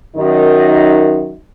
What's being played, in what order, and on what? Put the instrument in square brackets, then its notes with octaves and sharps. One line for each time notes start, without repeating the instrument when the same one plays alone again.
[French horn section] F#2 D#3 D#4